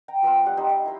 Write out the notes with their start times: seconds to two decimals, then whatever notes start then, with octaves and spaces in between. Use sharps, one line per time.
0.08 G5 A#5
0.22 F3 B3 C4 F4
0.46 G3 F#5
0.57 D#4 G4 C5
0.69 D#5
0.86 E4 C5 B5